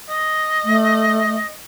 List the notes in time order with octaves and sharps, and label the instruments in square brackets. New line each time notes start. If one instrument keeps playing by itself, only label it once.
[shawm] D#5
[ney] A3